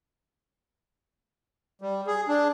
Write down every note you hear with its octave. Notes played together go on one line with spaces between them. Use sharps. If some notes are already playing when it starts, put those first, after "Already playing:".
G3
G#4
D4